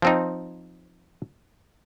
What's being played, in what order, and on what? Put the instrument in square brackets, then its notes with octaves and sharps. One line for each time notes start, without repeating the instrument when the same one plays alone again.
[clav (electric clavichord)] F3 C4 D#4